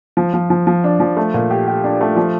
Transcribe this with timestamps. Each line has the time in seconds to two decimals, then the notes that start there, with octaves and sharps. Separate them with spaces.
0.17 F3
0.34 F3
0.50 F3
0.67 F3
0.84 D4
1.00 F3
1.17 A3
1.34 A#2
1.51 G4
1.67 G4
1.84 D4
2.01 A3
2.16 F3